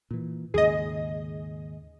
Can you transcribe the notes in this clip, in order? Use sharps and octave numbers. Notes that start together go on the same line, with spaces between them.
A#2 E3
D#2 G#2 C#3 G#4 D#5